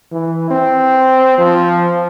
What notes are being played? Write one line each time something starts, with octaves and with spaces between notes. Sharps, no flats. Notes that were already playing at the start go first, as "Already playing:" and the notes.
E3
C4
F3